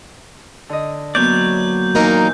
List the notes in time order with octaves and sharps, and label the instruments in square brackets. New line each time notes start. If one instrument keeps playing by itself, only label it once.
[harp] D3 D#5
[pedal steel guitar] F#3 C#5 D5 [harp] A#3 B3 [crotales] G6
[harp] D#2 A#2 E3 [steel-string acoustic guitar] A#3 D#4 A#4